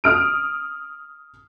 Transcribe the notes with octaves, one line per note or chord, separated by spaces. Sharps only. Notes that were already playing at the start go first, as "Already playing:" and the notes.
D#6 F6 D7